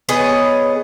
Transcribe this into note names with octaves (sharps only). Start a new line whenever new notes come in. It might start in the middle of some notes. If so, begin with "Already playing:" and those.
B3 G#4 C#5 D#5